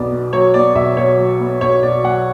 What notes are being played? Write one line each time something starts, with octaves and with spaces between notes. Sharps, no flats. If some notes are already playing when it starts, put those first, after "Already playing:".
Already playing: B1 B3 D5
B2
F#3 C#5
B3 D5
B1 E5
B2 C#5
F#3
B3
B1 C#5
B2 D5
F#3 F#5